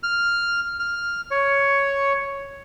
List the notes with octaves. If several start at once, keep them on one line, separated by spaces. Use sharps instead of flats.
F6
F6
C#5